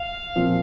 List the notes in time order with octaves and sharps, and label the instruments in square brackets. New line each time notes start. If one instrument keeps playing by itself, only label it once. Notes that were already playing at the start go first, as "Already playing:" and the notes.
Already playing: [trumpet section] F5
[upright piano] A#2 F3 C4